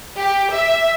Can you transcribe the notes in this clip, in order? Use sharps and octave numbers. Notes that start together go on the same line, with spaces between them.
G4
E5